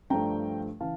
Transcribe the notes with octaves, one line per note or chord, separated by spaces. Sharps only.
G2 F3 A3 D4 G5 A#5
C#3 E3 F5 A5